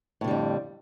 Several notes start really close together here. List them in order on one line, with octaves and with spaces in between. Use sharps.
A2 D3 G3 F2